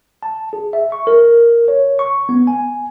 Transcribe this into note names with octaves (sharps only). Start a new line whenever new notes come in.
A5
G#4
E5
C#6
A#4
C#5
C#6
B3
G#5